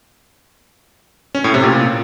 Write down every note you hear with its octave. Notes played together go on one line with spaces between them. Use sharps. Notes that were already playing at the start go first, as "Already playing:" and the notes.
C#4
A2
C3
A#2